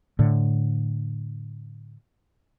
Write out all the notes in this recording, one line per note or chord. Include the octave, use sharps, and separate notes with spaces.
A2 D3